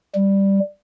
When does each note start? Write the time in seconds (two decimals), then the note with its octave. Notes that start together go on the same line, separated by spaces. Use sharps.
0.15 G3